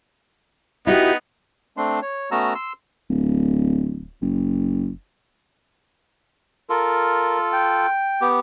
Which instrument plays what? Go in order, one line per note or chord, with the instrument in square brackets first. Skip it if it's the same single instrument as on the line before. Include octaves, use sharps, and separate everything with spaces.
[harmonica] B3 D#4 [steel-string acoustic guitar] E4 F#4 G4
[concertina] A3 C4 D4 C6
C#5
A3 B3 C#4 F#4 A#5 E6
C6 E6
[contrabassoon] D1
F#1
[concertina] F4 A4 [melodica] A#4
[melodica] G5
[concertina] B3 G4